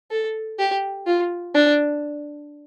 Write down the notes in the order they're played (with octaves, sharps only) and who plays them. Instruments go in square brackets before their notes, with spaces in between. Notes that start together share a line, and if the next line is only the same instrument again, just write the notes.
[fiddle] A4
G4
F4
D4